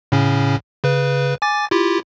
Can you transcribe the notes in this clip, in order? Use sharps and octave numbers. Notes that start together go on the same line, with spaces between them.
A2 C#3 C#4
C#3 B4
G#5 D6 A6
E4 F4 G4